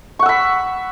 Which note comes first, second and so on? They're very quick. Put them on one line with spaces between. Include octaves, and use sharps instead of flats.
C#6 F#5 E6 B5